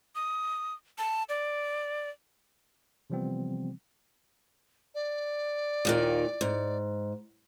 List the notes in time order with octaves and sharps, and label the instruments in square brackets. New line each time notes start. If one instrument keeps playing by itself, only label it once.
[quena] D#6
A5
D5
[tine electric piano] C3 E3 F3 G3 B3 C4
[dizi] D5
[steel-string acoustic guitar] D#2 A#2 D#3
G#2